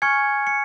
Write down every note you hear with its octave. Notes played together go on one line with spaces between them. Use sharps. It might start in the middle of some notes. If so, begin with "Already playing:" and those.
G#5 C#6 F6 G#6 C#7
C#7